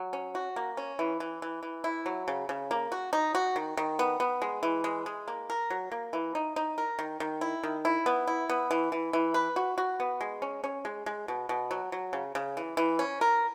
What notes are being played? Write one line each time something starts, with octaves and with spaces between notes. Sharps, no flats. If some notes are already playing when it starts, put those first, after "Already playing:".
Already playing: F#3
C#4
F#4
A#3
C#4
E3
E3
E3
E3
E4
F#3
C#3
C#3
A#3
F#4
D#4
F#4
D#3
D#3
B3
B3
G#3
E3
G#3
G#3
A#3
A#4
F#3
A#3
E3
D#4
D#4
A#4
D#3
D#3
E4
D#3
E4
B3
E4
B3
E3
E3
E3
B4
F#4
F#4
B3
G#3
C#4
C#4
G#3
G#3
B2
B2
F#3
F#3
C#3
C#3
E3
E3
C#4
A#4